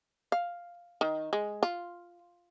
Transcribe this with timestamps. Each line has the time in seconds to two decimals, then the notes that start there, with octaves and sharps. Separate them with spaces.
0.32 F5
1.01 D#3
1.33 G#3
1.63 F4